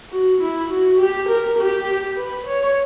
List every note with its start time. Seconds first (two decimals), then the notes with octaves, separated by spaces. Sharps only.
0.11 F#4
0.41 E4
0.70 F#4
0.99 G4
1.29 A#4
1.58 G4
2.17 B4
2.46 C#5